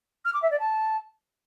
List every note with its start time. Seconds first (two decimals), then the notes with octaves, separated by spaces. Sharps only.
0.25 F6
0.33 D6
0.42 E5
0.51 D5
0.59 A5